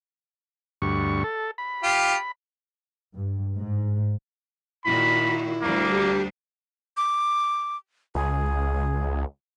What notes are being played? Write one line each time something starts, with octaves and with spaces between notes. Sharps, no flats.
D2 G2 C#6
A4
B5
F4 G4
G2
G#2
A#2 D#3 E4 F#4 B5
D2 G3 A#3 D4
G4
D6
C#2 G#4